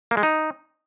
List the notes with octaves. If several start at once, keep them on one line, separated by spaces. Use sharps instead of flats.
A#3
G#3
D#4